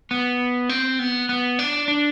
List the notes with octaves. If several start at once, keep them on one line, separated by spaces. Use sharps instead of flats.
B3
C4
B3
B3
D4
D4